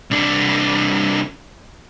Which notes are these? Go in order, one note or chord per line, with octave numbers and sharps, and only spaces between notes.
C2 D4